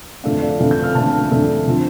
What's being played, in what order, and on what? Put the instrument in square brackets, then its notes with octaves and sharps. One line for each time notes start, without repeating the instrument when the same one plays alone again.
[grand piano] F2 D3 A3 D4 F5
D5
F2 D3 A3 D4 F5
G6
F6
F2 D3 A3 D4 A5
F2 D3 A3 D4
D3 F3 C4